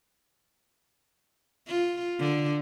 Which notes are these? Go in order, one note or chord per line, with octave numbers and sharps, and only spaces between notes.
F4
D3